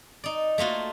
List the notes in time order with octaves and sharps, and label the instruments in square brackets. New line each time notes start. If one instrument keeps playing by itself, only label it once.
[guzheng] D#4 D5
A3 A#3 F4 F#4